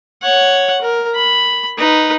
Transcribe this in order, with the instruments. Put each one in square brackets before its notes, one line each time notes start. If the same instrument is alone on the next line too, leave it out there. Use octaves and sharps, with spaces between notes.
[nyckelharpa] C#5 F#5
A#4
B5
D#4 B4